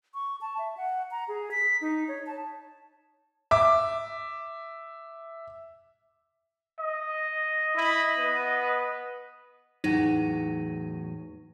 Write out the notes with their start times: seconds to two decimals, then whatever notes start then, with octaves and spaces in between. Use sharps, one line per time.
0.14 C#6
0.41 A5
0.58 E5
0.77 F#5
1.11 A#5
1.28 G#4
1.51 B6
1.81 D#4
2.08 C#5
2.27 A5
3.51 E5 D6
6.80 D#5
7.76 E4 B5
8.18 B3 B4
9.84 E2 A2 F#3 D#4